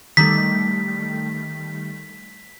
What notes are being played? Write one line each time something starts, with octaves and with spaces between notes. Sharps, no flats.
D#3 G3 A3 B6